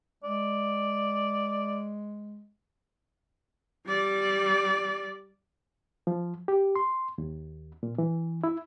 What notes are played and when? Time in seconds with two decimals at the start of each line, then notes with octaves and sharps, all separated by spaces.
0.23 G#3 D5
3.87 G3 D5
6.07 F3
6.48 G4
6.76 C6
7.18 D#2
7.83 A#2
7.98 E3
8.44 E4